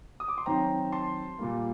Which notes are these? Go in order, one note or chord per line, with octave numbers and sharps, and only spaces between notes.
D#6
D6
C6
D#3 F#3 C4 G5 A#5
A5 C6
A#2 G3 A#3